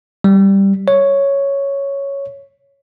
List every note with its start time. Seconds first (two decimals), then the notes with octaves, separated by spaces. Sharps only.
0.24 G3
0.88 C#5